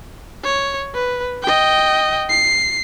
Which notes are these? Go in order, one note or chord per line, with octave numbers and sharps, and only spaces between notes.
C#5
B4
D#5 G5
C7